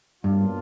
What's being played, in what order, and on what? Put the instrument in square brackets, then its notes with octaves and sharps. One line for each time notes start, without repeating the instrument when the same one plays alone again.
[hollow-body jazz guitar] G2 [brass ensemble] B2 F#3 A#3 D4 F4